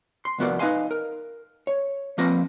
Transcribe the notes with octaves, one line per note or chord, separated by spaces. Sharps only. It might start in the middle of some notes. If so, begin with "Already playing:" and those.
C6
C2 F2 B3 F#4 A#4 D5
D#4 B4 D#5 F5 G#5 C6
A#4
C#5
F3 A#3 C4 B4 A#5